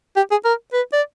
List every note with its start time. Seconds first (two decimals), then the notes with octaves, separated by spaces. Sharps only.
0.16 G4
0.31 G#4
0.45 A#4
0.73 B4
0.93 D5